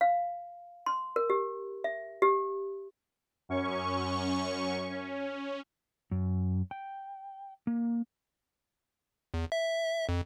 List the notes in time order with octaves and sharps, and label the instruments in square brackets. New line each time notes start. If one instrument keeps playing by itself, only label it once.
[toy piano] F5
C6
A#4
G4
E5
G4
[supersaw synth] F#2 C#4 C#6
C#4
[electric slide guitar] F#2
G5
A#3
[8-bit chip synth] E2
E5
F2